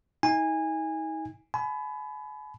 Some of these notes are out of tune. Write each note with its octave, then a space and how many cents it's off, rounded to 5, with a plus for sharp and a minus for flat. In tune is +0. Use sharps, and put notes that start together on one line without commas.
D#4 +40 G#5 -20
G#5 +40 B5 +15